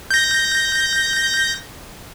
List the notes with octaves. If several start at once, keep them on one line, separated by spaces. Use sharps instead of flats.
G6 A#6